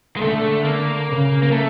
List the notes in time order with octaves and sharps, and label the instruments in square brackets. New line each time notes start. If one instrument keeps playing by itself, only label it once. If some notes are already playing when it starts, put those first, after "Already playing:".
[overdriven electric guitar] G#3
[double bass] D3 [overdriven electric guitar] A3
[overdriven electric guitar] A#3
[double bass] C#3
[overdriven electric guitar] A#3
A3